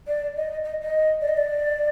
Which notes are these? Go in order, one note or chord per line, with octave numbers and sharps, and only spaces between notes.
D5
D#5
D#5
D#5
D5
D#5
D5